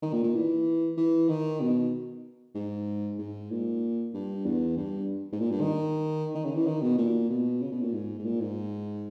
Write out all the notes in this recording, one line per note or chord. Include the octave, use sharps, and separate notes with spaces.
D#3
A#2
A#2
E3
E3
D#3
B2
G#2
G#2
A#2
G2
E2
G2
G#2
A#2
G2
D#3
D#3
C#3
E3
D#3
B2
A#2
B2
C#3
B2
A#2
G#2
G#2
A#2
G#2